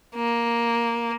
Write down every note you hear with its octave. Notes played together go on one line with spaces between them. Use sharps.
A#3